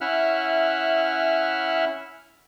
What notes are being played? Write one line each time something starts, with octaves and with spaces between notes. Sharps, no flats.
C#4 E4 E5 F#5 F6 F#6